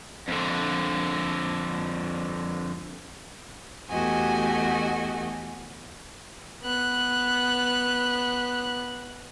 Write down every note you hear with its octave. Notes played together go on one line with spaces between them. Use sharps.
F2 D3
E2 A3 F#4 G4 D#5 G#5
B3 F#6